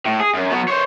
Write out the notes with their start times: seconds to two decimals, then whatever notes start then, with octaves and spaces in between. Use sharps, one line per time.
0.06 A2
0.20 G#4
0.34 F#2
0.51 F#3 B3
0.68 C5 C#5